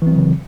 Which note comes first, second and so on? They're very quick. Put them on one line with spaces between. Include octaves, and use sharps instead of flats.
E3 C4 F#3 C#3